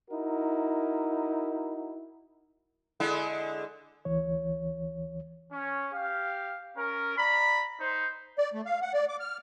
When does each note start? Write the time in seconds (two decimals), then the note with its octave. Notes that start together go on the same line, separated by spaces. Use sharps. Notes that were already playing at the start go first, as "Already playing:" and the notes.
0.10 D#4 E4 F#4 A#4
3.00 D3 G#3 E4
4.05 D2 E3 C#5
5.51 C#4
5.92 G4 F5
6.77 C#4 A#4
7.18 D5 A#5 B5
7.80 D#4 C5
8.38 D5
8.54 A3
8.66 F5
8.82 F#5
8.94 D5
9.09 D6
9.20 F6